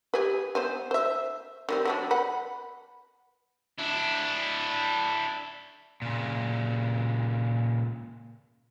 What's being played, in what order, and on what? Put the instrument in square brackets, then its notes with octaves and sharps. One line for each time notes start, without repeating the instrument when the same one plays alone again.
[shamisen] G4 G#4 B4
B3 C5 G#5
C5 E5
D#3 G3 C4
F#3 B3 D4
B4 F#5 B5
[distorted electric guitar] D4 E4
[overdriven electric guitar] A#2 C#3